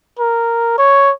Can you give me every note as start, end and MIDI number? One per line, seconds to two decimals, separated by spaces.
0.19 0.74 70
0.78 1.12 73